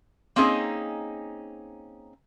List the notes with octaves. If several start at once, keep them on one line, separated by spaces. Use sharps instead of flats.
A#3 C4 C#4 D#4 G#4 D#5